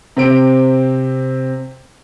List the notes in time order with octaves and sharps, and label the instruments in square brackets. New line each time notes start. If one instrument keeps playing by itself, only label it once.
[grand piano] C3 C4 D7